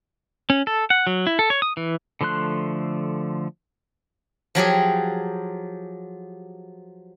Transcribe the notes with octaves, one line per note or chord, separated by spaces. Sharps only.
C#4
A4
F#5
F#3
E4
A4
C#5
D#6
E3
D3 F3 A3 C6 F#6
F3 F#3 G4 G#4